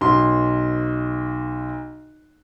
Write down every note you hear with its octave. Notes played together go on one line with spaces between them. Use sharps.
B1 C6